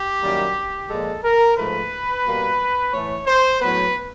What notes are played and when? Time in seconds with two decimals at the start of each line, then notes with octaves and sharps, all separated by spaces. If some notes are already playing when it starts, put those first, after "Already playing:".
Already playing: G4
0.22 F#2 D#3 G3 A#3
0.89 A#2 F3 G#3 A4
1.24 A#4
1.57 G#2 F3 A3 B4
2.25 B2 G3 A#3
2.92 A2 E3 A3 C#5
3.26 C5
3.60 A2 F#3 B3 B4